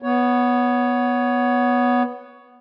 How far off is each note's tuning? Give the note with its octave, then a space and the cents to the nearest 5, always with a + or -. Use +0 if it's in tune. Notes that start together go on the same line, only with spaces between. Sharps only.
B3 +0 C#5 +15